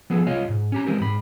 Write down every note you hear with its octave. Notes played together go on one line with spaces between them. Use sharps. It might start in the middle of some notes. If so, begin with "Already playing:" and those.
F3 B3 G#4 A4
C2 F4 C#5 D#5 F5
G#2
C#4 G4 A#5
E3 G#3 C4 G4 A#4
G#2 B5